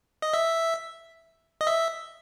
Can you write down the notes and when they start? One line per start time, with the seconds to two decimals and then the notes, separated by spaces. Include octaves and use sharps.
0.22 D#5
0.34 E5
1.61 D#5
1.67 E5